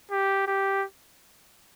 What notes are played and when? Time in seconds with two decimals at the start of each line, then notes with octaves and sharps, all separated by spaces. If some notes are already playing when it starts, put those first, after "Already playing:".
0.11 G4
0.47 G4